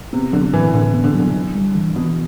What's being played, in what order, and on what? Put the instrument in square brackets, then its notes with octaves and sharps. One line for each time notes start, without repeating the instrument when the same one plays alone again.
[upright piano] C3 [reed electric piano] B3
[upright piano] D3 [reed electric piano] F#3
[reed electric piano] A2 [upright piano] E3
[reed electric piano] A2 [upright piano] D3
[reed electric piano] B3
[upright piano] D3
[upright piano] D3 [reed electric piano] F#3
[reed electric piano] D4
G3
E3
[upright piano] B2 [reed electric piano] E3